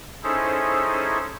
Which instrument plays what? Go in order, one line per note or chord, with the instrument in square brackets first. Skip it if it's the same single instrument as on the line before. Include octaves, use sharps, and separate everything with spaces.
[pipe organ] C#4 D#4 E4 G#4 A4 C5